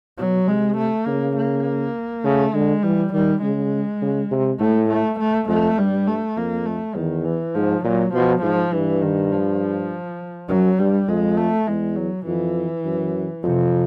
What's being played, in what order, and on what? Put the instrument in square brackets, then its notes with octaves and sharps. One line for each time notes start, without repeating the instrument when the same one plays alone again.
[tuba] B2 [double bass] F#3
[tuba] C3 [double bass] G#3
[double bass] A3
[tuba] C#3 [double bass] A#3
[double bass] A#3
[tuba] C#3 [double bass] A3
[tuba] D3 [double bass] G#3
[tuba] E3 [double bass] G3
[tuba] D#3 [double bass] G3
[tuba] C#3 [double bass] G#3
[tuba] C#3
C3
[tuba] A2 [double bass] A3
[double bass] A3
A3
[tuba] F2 [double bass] A3
[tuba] G2 [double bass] G3
[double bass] A3
[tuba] F2 [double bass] A#3
[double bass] A3
[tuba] E2 [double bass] D#3
[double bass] E3
[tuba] G#2 [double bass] F3
[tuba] A#2 [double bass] F#3
[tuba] B2 [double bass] F3
[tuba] G#2 [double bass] F3
[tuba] G2 [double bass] E3
[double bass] D#3
F3
[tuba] F#2 [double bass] F#3
[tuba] G2 [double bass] G3
[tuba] F2 [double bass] G#3
[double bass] A3
[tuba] E2 [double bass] G#3
[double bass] F#3
[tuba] F2 [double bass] E3
[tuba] F#2
[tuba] F2 [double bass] C3